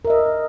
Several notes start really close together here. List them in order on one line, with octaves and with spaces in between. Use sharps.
A#4 E5 D#5